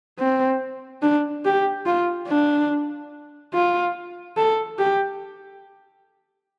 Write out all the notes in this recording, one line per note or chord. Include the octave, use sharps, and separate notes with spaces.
C4
D4
G4
F4
D4
F4
A4
G4